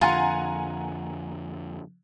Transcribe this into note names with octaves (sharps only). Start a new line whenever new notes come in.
F2 D3 F4 F#5 G#5 A#5